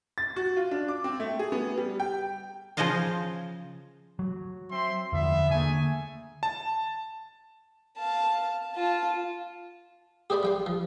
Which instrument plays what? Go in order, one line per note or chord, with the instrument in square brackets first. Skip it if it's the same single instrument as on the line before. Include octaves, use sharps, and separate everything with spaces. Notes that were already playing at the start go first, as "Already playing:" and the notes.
[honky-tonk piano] A6
F#4
F4
D4
D6
C4
A3
G#4
B3
G3
G5
[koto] C#3 F3 G#4 C5 D#5 F5
[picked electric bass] F#3
[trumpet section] C4 E5 C6
[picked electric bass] E2 D3 F3 [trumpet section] B3 E5
[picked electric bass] D3 A#3 [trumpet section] A3 G#4 G#5
[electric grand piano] A5
[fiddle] F5 A5
F4 A5
[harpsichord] G4 G#4 C5 D5 B5
G3 G5 C6
F3